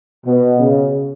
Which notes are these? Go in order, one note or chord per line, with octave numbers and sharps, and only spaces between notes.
B2
C#3